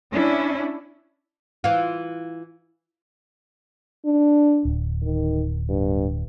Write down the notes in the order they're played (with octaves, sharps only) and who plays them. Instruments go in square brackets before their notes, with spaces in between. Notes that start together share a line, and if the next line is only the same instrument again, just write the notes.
[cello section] C#4 D4 E4
[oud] E3 F4
[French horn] D4
[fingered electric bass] D1
[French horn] D#3
G2